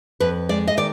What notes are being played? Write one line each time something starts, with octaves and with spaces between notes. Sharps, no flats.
F2 B4
G#3 D5
D#5
D#3 D5